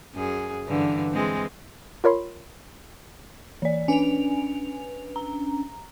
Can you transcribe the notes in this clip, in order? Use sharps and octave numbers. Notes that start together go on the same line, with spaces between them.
F#2 G#4
G2 D3 E3
E3 G#3 C4
F4 A#4 C#5 B5 C6
E3 D5
C#4 D4 B4 G#5 F7
A#5